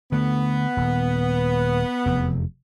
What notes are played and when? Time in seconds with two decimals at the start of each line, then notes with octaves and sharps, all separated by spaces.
0.12 D3 A3 B3
0.77 D#1
2.06 F1 E2